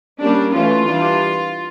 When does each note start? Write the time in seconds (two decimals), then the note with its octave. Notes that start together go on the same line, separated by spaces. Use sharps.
0.21 G3 A#3 C#4 D4
0.54 E3 A3 C#4 F4
0.88 E3 G3 D4